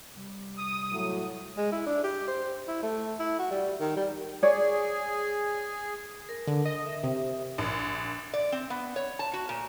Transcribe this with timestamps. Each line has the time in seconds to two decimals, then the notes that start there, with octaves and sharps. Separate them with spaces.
0.13 C3 G3
0.58 D#6
0.91 A2 F#3
1.57 G#3
1.72 E4
1.87 D4
2.04 G4
2.28 C5
2.68 E4
2.83 A3
3.20 E4
3.39 F#4
3.51 G3
3.80 D#3
3.96 G3
4.43 G#4 C#5 D5
6.29 A#4
6.47 D3
6.66 D#5
6.86 E5
7.03 C3
7.58 A#1
8.34 D5
8.52 C4
8.70 B3
8.96 C#5
9.19 A5
9.33 F#4
9.49 A#2